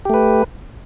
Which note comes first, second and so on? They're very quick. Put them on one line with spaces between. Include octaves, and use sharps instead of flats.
G4 A3 B4